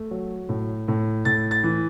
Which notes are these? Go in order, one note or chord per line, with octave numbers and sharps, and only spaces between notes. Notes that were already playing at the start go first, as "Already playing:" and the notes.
Already playing: A3
F#3
A2
A2
A2 A6
A6
E3